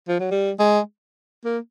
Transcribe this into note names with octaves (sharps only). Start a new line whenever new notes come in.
F3
F#3
G3
G#3
A#3